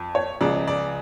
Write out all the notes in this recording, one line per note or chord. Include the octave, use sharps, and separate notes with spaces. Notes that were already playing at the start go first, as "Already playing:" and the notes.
Already playing: F2
C#5
C#2 C#3 F3 D5
D5